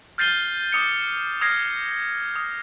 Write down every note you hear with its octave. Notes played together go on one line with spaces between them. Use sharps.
F6 G6 A6 C7 D#7 G7
D6 D#6 C#7
D#6 F6 G#6 A#6 C7
D#6